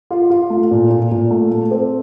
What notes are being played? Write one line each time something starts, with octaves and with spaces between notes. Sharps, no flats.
F4
F4
A3
A#2
A#2
A#2
A3
A3
C4